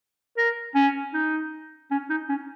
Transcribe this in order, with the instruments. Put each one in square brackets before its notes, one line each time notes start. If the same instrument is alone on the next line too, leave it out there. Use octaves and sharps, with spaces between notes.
[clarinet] A#4
C#4
D#4
C#4
D#4
C#4